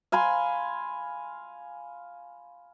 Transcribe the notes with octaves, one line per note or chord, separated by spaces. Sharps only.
F5 G#5 B5 C6